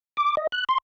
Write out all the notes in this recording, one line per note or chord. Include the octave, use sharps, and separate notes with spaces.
D6
D#5
F#6
C6